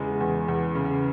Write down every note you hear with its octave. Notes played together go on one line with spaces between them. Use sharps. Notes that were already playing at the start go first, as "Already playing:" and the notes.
Already playing: E2 C#3 G#3
E2
E2
C#3